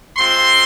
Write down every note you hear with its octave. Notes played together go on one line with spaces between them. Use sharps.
G#3 C4 F4 C6